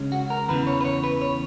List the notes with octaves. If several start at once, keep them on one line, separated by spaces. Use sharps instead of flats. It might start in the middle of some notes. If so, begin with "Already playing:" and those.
Already playing: C#3 G#3 C#4
F#4
A#4
E2 C#3 E3 B4
C#5
B4
C#5
B4
C#5